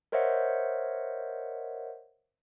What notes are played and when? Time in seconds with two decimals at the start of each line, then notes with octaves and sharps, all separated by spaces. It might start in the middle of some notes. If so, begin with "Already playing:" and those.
0.12 A#4 C5 C#5 D#5 E5 F#5